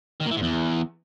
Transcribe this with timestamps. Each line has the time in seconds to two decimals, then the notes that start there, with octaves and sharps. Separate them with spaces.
0.21 D#3
0.26 A#2
0.31 E3
0.37 G#2
0.42 E2